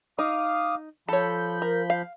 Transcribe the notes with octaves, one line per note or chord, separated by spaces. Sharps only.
D#4 F5 D6 D#6
F3 A4 C#5 B5 G6
A#4
F5